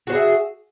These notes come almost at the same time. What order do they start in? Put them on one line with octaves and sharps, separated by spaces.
F#4 C5 G#4 E5